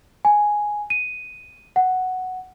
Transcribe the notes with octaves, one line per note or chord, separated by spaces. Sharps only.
G#5
D#7
F#5